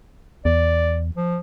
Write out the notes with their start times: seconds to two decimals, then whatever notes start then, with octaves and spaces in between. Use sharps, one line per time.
0.45 E2 D5
1.16 F3